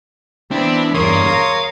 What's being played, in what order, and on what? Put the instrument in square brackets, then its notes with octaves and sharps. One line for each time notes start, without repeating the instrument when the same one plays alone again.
[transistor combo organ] E3 [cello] B3 [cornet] C4 [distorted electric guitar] D4
[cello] E2 G2 [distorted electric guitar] A#3 [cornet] C#5 [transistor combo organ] C6 D#6
[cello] A#4 [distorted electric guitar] F5